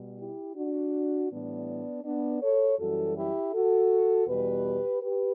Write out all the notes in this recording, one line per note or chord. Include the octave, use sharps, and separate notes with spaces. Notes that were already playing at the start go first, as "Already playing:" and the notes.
Already playing: B2 G3
E4 G4
D4 F#4
A2 E3 G3 B3 D4
B3 D4
A4 C#5
F#2 E3 G3 F#4 A4
E4 G4
F#4 A4
E2 B2 G3 G4 B4
G4 B4